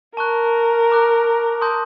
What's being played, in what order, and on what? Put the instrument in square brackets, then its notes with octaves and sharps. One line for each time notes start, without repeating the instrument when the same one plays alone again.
[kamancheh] A#4 [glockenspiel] A5 C#6 F#6
[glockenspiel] A#5 D6 F#6
A5 C6 D#6 G6